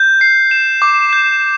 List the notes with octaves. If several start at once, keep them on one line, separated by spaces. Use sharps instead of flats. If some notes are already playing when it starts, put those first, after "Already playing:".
Already playing: G6
C7
E7
D6
G6